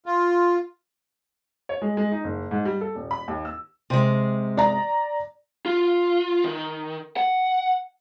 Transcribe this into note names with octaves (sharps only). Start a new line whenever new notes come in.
F4
C#5
G#3
G#3
D#4
F#1
G#2
G3
A4
D#1
B5
D#2
E6
C3 G#3
D5 A#5
F4
D#3
F#5